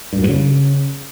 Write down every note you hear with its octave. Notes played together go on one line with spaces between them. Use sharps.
G2
F#2
G2
C#3